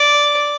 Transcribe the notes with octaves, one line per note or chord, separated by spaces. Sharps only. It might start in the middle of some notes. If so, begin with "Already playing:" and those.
Already playing: D5